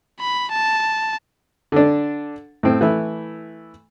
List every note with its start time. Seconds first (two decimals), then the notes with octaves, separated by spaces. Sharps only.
0.21 B5
0.52 A5
1.72 D3 D4
2.63 A2 C4
2.81 E3 A3 E4